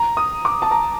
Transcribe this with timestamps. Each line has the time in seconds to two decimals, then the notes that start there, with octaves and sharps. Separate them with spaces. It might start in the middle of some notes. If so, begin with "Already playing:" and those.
Already playing: A#5
0.17 D#6
0.45 D6
0.62 A5
0.71 A#5